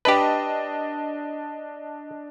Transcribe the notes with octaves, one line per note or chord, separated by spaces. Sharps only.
D4 G4 B4 D#5 A5